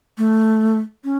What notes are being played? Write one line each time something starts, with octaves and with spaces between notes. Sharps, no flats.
A3
C#4